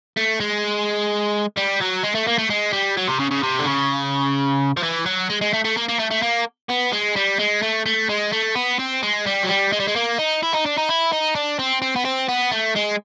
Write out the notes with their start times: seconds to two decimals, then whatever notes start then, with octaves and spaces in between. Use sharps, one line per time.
0.17 A3
0.40 G#3
1.57 G3
1.80 F#3
2.03 G#3
2.15 A3
2.27 A#3
2.38 A3
2.50 G#3
2.73 G3
2.97 F#3
3.08 C3
3.20 C#3
3.31 C#3
3.43 C3
3.59 D3
3.66 C#3
4.77 F3
4.83 E3
5.06 F#3
5.30 G#3
5.41 G#3
5.53 A3
5.64 A3
5.77 A#3
5.88 A#3
5.99 A3
6.11 A3
6.22 A#3
6.69 B3
6.92 G#3
7.16 G3
7.39 G#3
7.62 A3
7.86 A3
8.09 G#3
8.32 A3
8.55 B3
8.79 C4
9.03 G#3
9.26 G3
9.43 F#3
9.49 G3
9.72 G#3
9.80 G3
9.88 G#3
9.96 A#3
10.18 D#4
10.43 E4
10.53 D#4
10.66 D4
10.78 D#4
10.89 E4
11.13 D#4
11.35 D4
11.59 C4
11.82 C4
11.96 B3
12.05 C4
12.29 B3
12.51 A3
12.76 G#3